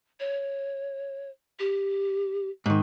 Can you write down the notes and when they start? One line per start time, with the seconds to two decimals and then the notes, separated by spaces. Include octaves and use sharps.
0.20 C#5
1.59 G4
2.66 G#2 D#3